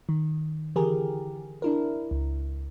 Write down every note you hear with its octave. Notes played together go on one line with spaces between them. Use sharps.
D#3
D3 E3 G4 G#4 A#4
D4 E4 A#4
C#2